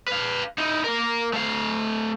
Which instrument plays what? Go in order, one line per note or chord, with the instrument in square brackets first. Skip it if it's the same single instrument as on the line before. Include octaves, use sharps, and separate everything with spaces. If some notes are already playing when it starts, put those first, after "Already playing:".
[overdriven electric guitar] B4 F5
D#4 E4
A#3 A#4
A3 F5